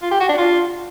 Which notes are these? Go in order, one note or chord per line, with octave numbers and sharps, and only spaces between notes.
F4
G4
F#4
D4
F4